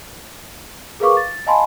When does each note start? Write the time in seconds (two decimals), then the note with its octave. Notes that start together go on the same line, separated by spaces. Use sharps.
1.00 G#4 A#4 B4 F5 C#6 D6
1.17 A6
1.47 D#5 F5 G#5 A5 B5 C6